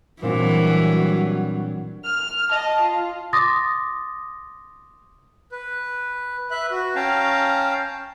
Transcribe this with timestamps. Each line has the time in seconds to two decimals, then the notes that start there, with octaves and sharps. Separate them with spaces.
0.22 A#2 E3 F#3 G3 C4 D4
2.04 F6
2.51 D#5 A5
2.81 F4
3.33 C6 D6 D#6 A6 A#6
5.52 B4
6.51 B4 E5 F#6
6.71 F#4
6.96 C#4 F5 G5 A5 A#5